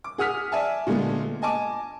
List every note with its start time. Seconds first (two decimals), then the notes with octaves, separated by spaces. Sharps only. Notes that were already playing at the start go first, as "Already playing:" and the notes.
0.04 D6
0.18 G#4 F#5 D#6 F6 B6
0.52 D5 E5 G#5 A5
0.87 A#2 D3 G#3 A3 B3
1.42 D#5 G#5 A5 D6